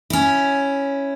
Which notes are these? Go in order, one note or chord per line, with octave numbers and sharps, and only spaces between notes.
C#4 E4